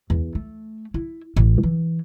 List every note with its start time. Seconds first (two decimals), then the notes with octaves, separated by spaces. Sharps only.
0.10 E2
0.35 A3
0.94 E4
1.36 A1
1.63 E3